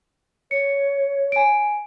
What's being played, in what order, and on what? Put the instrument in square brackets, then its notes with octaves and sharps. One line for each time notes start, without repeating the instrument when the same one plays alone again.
[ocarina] C#5 [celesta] C#7
[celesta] G#5 D7